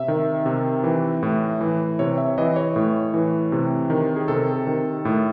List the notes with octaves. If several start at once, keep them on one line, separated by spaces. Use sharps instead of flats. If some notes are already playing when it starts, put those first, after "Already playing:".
Already playing: C3 E5
D#3
C3
E3
A2
E3
C3 C#5
E5
E3 D#5
C#5
A2
E3
C3
D#3
G#4
C3 A4
D#3
A2